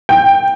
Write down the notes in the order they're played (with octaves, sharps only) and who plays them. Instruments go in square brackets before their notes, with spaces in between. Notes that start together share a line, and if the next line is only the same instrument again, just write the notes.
[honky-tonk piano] G5